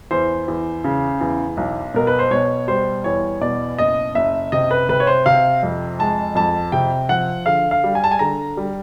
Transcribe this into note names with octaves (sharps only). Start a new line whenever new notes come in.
E2 C5
E2
C#3
E2
B1
B2 A#4
B4
C5
B2 C#5
G3 C5
E2 C#5
B2 D5
F#1 D#5
F#1 E5
C3 D#5
B4
C3 B4
C#5
C5
C3 F5
F2
G#3 A5
F2 A5
C3 G5
F3 F#5
D3 F5
F5
G3
G#5
A5
G#5
D3 A#5
G3